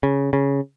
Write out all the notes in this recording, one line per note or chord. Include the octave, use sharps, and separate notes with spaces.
C#3
C#3